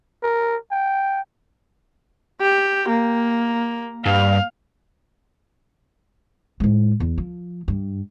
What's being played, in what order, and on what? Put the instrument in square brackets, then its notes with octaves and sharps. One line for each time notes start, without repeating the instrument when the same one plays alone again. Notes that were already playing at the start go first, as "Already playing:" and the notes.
[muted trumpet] A#4
G5
[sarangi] G4
A#3
[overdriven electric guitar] G2 [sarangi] F5
[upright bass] A2 G#3
E2
F3
G2